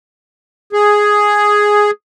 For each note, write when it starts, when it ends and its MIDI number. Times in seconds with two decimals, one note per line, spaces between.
0.73 1.91 68